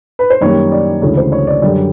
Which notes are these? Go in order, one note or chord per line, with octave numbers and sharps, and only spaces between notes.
B4
C5
F#2 D#3 G3 A#3 C#5
D5
D2 C#3 E3 G#3 C#5
C5
C#5
D5
F#2 D3 G3 D5